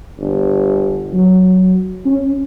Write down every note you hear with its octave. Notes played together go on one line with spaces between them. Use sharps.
G1
F#3
C#4